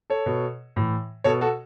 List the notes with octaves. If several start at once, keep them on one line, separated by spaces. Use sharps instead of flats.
A4 C#5
B2
A2 E3
B2 A4 C#5
F#4 A4